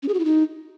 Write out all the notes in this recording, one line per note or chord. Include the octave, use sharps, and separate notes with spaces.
C#4
G#4
F#4
E4
D#4